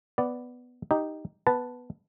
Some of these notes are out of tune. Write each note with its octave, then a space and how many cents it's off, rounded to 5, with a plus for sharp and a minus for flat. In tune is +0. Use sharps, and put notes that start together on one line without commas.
B3 +5 D5 +0
D#4 +0 G4 +0
B3 +0 B4 +0 A5 +0